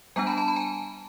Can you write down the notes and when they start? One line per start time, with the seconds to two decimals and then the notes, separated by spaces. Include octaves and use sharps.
0.16 G3 B3 D4 G#5 A#5
0.27 A5 B5
0.37 A5 B5
0.48 A5 B5
0.56 G#5 A#5